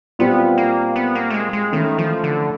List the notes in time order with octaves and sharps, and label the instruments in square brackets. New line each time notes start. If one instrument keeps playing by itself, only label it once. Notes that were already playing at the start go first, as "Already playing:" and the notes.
[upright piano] A#2 G3 C4 F4 [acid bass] B3
[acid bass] A#3
B3
A#3
A3
G#3
G#3
[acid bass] D#3 [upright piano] E3 A3 C#4 E4
[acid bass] F3
D3